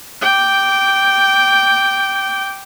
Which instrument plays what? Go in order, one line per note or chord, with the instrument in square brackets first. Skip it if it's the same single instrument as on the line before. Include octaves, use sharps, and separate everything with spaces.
[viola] G5 D6